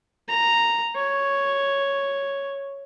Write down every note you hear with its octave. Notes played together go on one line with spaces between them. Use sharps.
A#5
C#5